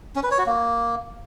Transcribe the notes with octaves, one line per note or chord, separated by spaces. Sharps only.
C#4
B4
C#5
F#4
A#3